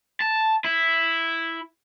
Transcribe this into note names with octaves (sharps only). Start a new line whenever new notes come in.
A5
E4